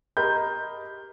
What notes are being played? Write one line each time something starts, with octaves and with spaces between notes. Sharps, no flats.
G4 A#4 D#5 B5 C6 G6